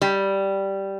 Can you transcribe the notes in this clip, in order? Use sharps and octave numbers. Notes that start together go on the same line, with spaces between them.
G3